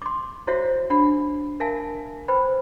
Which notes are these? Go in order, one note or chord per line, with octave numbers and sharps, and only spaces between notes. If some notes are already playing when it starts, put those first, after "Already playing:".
C6 D6
E4 F#4 C5 C#5 E5 F#5
D4 F#5 B5
A#4 E5 F5 G#5 A5
B4 C5 G5 B5